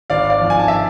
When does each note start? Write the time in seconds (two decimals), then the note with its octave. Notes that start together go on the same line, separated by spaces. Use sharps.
0.10 G#1 D5 F5
0.30 D5 F5
0.40 G#2 F3
0.50 G#5
0.59 A5
0.68 E5 G#5